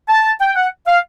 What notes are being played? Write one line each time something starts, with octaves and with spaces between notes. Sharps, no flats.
A5
G5
F#5
F5